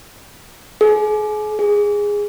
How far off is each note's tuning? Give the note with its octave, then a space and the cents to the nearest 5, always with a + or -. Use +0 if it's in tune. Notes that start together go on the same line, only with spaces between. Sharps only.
G#4 +35
G#4 -10